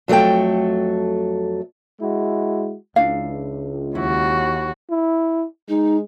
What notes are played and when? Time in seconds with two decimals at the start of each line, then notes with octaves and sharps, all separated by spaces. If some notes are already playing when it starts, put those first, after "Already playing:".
0.08 F2 F#3 A3 A4 G5
2.01 G#3 E4 F#4
2.96 C#2 D4 E4 F5
3.95 D#2 E4 F#4
4.90 E4
5.69 G#3 D#4